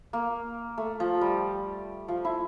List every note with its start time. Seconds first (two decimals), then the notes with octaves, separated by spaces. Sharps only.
0.13 A#3
0.78 A3
1.00 F3
1.21 G3
2.08 F3
2.25 E4